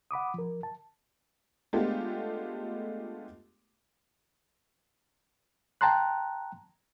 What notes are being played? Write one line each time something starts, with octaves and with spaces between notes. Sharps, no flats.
F#5 B5 D6 D#6
F3 A#4
A5
G#3 A3 B3 D4 F4 G4
G5 A5 A#5 C6 F#6